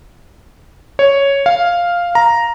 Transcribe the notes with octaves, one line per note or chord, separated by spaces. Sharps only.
C#5
F5
A#5